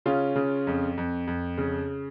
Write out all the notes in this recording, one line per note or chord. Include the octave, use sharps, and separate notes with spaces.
C#3 C#4 F4
C#3
F2
F2
F2
C#3